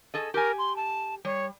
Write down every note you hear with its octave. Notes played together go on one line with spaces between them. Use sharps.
G#4 A4 D#5
G4 A#4 G#5
C6
A5
G3 C#5